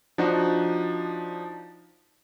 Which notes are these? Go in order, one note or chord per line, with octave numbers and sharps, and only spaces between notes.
F3 D4 D#4 F#4